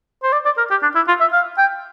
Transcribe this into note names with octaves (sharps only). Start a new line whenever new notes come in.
C5
D5
D5
A#4
G4
D4
E4
F4
E5
F5
G5